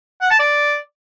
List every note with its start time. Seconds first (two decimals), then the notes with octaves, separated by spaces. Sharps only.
0.22 F#5
0.31 A5
0.40 D5